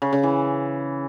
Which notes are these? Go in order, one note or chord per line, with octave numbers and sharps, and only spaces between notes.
C#3
C#3
E3